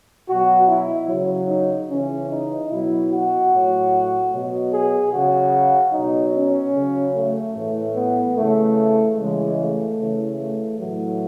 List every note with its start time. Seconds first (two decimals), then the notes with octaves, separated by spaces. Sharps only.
0.28 B2 F#3 F#4
0.67 E4
1.08 C#3 F#3
1.48 D#4
1.89 C#3 E3 C#4
2.29 D#4
2.69 B2 F#3 E4
3.10 F#4
3.51 A2 F#3
4.31 B2 F#3
4.71 G#4
5.11 C#3 F#3 F#4
5.92 B2 F#3 D#4
6.33 C#4
6.74 C#3 F#3
7.14 A3
7.54 A2 E3
7.95 B3
8.35 C#3 E3 A3
9.15 C#3 E3 G#3
9.56 A3
9.97 C#3 E3
10.38 A3
10.77 A2 E3 F#3